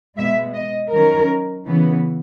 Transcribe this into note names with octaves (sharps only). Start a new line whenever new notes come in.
B2 G#3 B3 E5
D#5
D#3 F#3 C#4 A#4
C#3 E3 B3